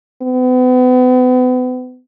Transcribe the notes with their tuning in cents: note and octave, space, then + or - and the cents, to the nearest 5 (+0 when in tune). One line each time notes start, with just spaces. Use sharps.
B3 +40